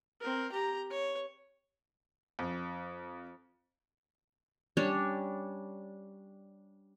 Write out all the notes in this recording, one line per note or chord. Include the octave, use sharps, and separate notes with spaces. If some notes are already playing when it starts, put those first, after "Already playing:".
C4 A#4
G4 A#5
C#5
F2
G3 C#4 D4 C#5